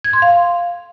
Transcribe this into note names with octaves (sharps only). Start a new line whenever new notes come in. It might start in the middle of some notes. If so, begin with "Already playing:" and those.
G#6
C6
F5